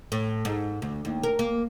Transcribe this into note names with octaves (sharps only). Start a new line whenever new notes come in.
A2
G#2
D2
D#2
A#4
A#3